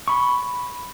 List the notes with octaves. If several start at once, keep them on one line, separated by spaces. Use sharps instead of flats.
B5 C#6